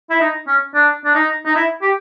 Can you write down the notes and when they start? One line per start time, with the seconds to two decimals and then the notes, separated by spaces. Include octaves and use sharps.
0.10 E4
0.20 D#4
0.47 C#4
0.75 D4
1.04 D4
1.14 D#4
1.46 D#4
1.55 E4
1.82 G4